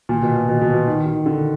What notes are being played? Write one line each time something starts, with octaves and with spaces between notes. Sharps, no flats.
A#2
B2
A#2
B2
B2
A#2
D#3
D#3
D3